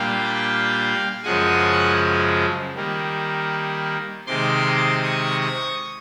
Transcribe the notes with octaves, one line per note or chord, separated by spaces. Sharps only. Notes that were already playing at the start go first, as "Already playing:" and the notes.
Already playing: A#2 G3 A#3 D4 F5 G5
F#2 C#3 F3 G#3 F#5 G#5
D#3 G3 A#3
C3 D#3 G#3 C6 D6
C#6 D#6
C#6 D#6